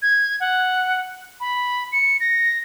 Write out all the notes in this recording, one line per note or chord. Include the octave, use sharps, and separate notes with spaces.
G#6
F#5
B5
C#7
A#6